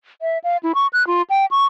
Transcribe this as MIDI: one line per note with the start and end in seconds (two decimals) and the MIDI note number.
0.22 0.38 76
0.44 0.57 77
0.63 0.72 64
0.75 0.87 85
0.93 1.06 90
1.07 1.22 65
1.30 1.46 79
1.51 1.65 85